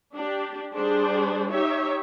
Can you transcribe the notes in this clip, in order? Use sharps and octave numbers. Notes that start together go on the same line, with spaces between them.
D4 G4
G3 D4 G#4 C5
D#4 G4 C#5 E5